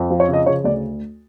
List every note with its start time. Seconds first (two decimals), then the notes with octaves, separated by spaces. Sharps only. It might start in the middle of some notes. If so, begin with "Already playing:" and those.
Already playing: F2
0.10 F3
0.20 C#5
0.28 C#3 D#5
0.46 C#3 C#5
0.64 D2 D5